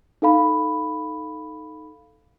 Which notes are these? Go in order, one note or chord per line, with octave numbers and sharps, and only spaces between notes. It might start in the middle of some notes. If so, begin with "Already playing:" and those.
D#4 A4 F5 B5